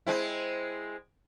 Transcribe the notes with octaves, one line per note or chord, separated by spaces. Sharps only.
G#3 C4 E4